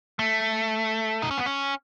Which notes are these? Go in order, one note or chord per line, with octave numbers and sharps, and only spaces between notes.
A3
D#4
C#4
B3
C#4